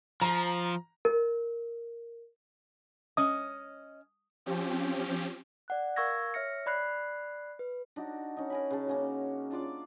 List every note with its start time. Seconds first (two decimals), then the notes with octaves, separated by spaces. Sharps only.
0.22 F3 A#5
1.05 A#4
3.17 C#4 D#5 D#6
4.46 F3 C4 C#4 G4
5.68 D5 F#5 F#6
5.96 A#4 F5 C#6 E6 G#6 A#6
6.34 C#5 E5 F6 A#6 C#7
6.66 D5 B5 F#6 C7
7.59 B4
7.96 D4 D#4 F#4
8.37 C#4 D#4
8.50 A#4 G#5 B5
8.71 C#3 A5
8.87 A#3 C#4 F#4
9.51 D4 F4 D5 D6